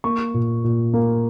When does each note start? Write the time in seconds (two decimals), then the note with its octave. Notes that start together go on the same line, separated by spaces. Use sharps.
0.04 A#3 C#6
0.34 A#2
0.64 A#2
0.94 A#3